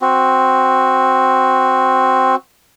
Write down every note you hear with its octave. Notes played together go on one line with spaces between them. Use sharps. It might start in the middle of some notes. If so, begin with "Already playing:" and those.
C4 F#4